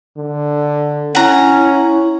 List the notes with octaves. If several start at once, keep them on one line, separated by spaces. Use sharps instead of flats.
D3
C#4 E4 F#5 A#5